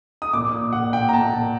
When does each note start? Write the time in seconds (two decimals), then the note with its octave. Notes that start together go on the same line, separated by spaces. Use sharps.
0.22 D#6
0.33 A#2 D6
0.53 A#2
0.72 A#2 F#5
0.93 A#2 G5
1.09 A#5
1.13 A#2 A5
1.33 A#2